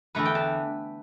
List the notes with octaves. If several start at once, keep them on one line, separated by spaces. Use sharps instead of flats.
E2 D3 A3 B4
G5
A5